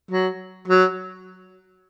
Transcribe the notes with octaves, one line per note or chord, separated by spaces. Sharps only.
F#3
F#3